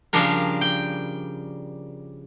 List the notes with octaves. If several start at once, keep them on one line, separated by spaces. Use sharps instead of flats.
C#3 F3 G3 D4 A#4
G5